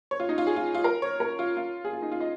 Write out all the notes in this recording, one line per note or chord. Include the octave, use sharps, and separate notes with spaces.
C#5
F4
D#4
F4
G#4
F4
F4
A#4
C#5
A#4
F4
F4
G#4
F4
D#4
F4
D#5